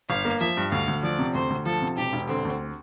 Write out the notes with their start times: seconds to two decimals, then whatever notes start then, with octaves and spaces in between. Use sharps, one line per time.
0.09 G1 F5
0.25 A#3
0.41 F3 E5
0.57 G2
0.72 D2 F5
0.88 D2
1.03 F3 D5
1.19 C3
1.34 D2 C5
1.50 D2
1.66 F3 A4
1.82 C3
1.97 E1 G4
2.13 E1
2.29 D3 C4
2.45 D2